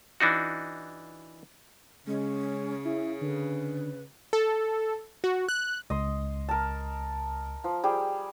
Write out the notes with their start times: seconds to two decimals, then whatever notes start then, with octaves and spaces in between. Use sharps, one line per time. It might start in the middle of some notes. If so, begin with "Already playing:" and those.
0.20 E3 D4 D#4 F#4
2.07 C#3 G#3 C#4
2.85 E4
3.21 D3 B4
4.33 A4
5.24 F#4
5.49 F#6
5.90 C#2 D#5 C6
6.49 A#4 A5
7.64 F3
7.84 G3 G#4 G5